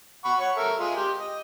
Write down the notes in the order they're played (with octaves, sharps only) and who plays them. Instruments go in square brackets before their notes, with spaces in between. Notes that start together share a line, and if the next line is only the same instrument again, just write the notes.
[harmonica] F#5 B5 C#6
C#5 F#5 C#6
A4 A#4 E5
G#3 F4 G#4
G4 C6
D#5